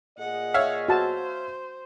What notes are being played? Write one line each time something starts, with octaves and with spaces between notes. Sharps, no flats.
A#2 G#4 D#5 F#5
C#5 E5 F5
F#4 C5 A5